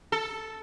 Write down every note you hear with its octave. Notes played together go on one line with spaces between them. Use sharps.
A4